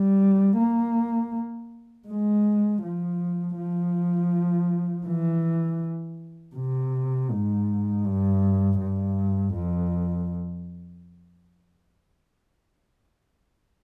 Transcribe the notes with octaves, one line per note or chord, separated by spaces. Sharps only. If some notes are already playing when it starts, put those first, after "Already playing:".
Already playing: G3
A#3
G#3
F3
F3
E3
C3
G#2
G2
G2
F2